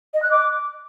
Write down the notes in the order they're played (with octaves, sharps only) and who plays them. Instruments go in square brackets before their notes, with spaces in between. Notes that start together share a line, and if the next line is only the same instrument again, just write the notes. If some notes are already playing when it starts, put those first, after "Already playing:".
[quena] D#5
F#6
D6